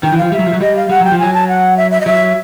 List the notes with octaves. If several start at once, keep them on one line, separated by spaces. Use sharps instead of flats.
D#3 G5
E3
F3 F5
G3 E5
F#3
F3
F#3
G3 D#5
F5
G3 F#5
F#3 G5
F3
F#3 G#5
A5
F#5
E5
E5
D#5
F#3 E5